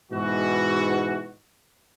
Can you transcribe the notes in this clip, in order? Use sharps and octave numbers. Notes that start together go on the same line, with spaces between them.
G#2 B2 E3 F#4